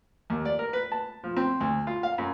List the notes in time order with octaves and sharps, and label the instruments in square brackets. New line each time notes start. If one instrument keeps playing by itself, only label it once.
[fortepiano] D#2
D5
A#4
B4
A5
F3
C4
D2
F4
F5
F#2